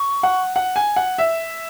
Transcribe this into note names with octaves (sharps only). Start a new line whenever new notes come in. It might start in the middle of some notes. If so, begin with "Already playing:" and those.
Already playing: C#6
F#5
F#5
G#5
F#5
E5